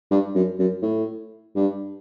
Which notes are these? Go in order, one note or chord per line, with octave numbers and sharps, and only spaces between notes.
G2
F#2
F#2
A2
G2